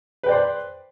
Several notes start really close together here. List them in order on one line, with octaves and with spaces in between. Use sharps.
B4 G5 D5 C5